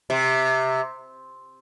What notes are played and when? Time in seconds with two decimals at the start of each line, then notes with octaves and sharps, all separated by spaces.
0.10 C3